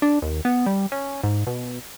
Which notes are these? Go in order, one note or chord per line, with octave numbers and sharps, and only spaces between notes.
D4
D#2
B3
G3
C#4
G#2
B2